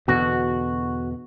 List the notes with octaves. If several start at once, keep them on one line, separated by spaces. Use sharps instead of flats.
E2 B2 D3 F#4